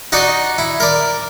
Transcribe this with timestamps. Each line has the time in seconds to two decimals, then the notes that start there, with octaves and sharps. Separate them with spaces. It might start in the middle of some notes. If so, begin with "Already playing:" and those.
0.12 D#4 F#4 D5 D#5
0.58 E4
0.80 A#4 D5